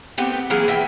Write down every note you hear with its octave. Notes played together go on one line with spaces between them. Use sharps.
A3 B3 C4 G4
E3 F#3 A#3 G#4
E3 E5 G5